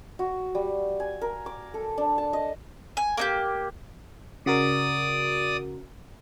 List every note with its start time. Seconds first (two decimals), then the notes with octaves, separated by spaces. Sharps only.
0.19 F#4
0.55 G3
1.00 G#5
1.21 A#4
1.46 D6
1.74 A4
1.98 D4
2.18 A5
2.33 D#5
2.97 G#5
3.17 A#3 D#4 G4
4.46 C#3 F#4 A#4 D5 D#6